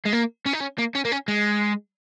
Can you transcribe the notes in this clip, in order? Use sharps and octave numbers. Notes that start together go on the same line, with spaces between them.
G#3
A#3
C#4
D#4
C#4
A#3
C#4
A#3
C#4
G#3